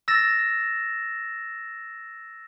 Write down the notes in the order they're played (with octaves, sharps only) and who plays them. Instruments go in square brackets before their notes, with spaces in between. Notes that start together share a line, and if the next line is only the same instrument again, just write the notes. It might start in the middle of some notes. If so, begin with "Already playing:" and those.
[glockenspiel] E6 A6 A#6 E7